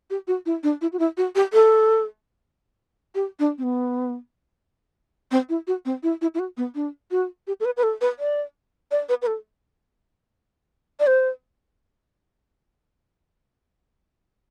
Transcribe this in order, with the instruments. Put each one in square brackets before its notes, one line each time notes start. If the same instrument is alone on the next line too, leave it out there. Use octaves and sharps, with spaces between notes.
[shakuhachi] G4
F#4
E4
D4
E4
F#4
E4
F#4
G4
A4
G4
D4
C4
B3
C4
E4
F#4
C4
E4
E4
E4
F#4
B3
D4
F#4
G4
A4
B4
B4
A4
B4
D5
D5
B4
B4
A4
D5
C5